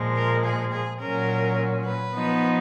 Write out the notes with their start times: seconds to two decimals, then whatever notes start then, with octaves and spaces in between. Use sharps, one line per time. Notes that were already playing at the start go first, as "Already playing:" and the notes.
Already playing: A#2 F3 G#3
0.16 A#4
0.44 G#4
0.72 G#4
1.00 A#2 F#3 C#4 A#4
1.85 B4
2.13 F3 B3 D#4